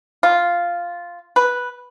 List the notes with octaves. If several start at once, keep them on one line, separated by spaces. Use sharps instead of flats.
F4
B4